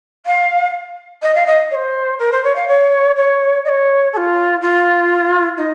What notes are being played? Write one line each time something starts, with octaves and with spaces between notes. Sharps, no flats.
F5
D#5
F5
D#5
C#5
C5
A#4
C5
C#5
F5
C#5
C#5
D#5
C#5
A4
F4
F4
D#4